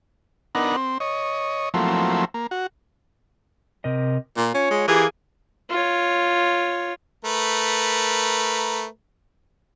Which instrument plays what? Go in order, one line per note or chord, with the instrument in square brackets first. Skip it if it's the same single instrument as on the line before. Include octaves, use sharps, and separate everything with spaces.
[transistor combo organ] B3 D4 D#4 A#4 F#5
C4
C#5 D#5
F3 F#3 A3 A#3 C4 E4
A#3
F#4
[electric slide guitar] C3 A#4 D#5
[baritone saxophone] A#2 [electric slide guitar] F4
[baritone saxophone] C#4 [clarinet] C#5
[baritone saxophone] G#3
[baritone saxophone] E3 [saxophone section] A#3 G#4 [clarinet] G4
[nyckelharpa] F4 C#5
[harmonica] A3 A#4 B4